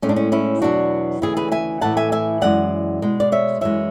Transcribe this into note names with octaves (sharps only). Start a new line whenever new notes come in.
A2 G#3 C#4
D4
C#4
C#4 E4
E2 B2 F#3 D4 F#4
D2 C#3 E3 E4 G#4
G#4 B4
E5 G#5
A2 E3 A3 F#5 A5
E5 G#5
E5 G#5
F#2 E3 G#3 D5 F#5
B2 G#3
D5
C#5 E5
F#2 E3 G#3 C#5 E5